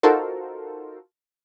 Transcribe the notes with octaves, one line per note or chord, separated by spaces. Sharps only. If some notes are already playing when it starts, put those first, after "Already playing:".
D#4 F4 F#4 A4 A#4 C5